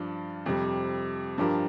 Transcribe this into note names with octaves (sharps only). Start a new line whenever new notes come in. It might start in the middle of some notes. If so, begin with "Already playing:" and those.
Already playing: G2 F3 D4
F2 C3 G3
G2 F3 D4 G4 A#4